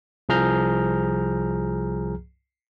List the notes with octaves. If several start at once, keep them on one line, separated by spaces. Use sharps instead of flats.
C2 F3 G#4 A#5 F6 G6